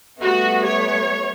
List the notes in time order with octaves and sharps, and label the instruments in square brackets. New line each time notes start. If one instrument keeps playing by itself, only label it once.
[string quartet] G3 A3 B3 [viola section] F#4
[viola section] C#5